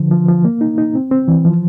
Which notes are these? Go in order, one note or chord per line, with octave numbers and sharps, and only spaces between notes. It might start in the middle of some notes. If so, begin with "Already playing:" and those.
Already playing: D3 F3
F3
F3
A#3
D#4
D#4
C4
C4
E3
F3